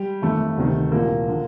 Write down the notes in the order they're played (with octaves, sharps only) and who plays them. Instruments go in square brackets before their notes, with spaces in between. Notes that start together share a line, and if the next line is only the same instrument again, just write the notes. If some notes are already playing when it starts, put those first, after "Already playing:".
Already playing: [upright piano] G3 G4
G1 F2 D#3 A3
D2 C3 D#3
C2 A#2 F3 A#3
D3 F3